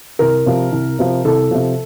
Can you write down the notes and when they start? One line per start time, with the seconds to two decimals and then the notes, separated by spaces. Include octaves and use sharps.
0.19 C2 A#4
0.46 C3 F3
0.72 C2
0.99 C3 F3
1.25 C2 A4
1.51 C3 F3